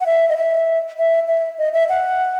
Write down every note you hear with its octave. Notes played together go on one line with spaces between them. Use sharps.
F#5
E5
D#5
E5
E5
E5
D#5
E5
F#5